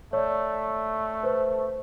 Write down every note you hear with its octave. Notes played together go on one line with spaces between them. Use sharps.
A3 C#5 D5
B4 C5